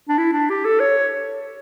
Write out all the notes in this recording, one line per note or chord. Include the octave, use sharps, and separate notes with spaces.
D4
E4
D4
G4
A4
C#5